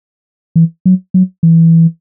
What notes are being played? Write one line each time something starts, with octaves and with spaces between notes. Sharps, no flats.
E3
F#3
F#3
E3